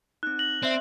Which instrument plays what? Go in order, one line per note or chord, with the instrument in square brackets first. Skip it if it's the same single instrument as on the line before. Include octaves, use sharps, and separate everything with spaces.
[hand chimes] C4 D#4 [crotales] F#6
[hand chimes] A#6 [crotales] F#7
[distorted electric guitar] C4 [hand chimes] D5 E5 C6